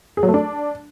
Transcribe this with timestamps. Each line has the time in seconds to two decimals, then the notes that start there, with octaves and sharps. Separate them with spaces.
0.17 G#4
0.23 F#3
0.28 A3
0.34 D4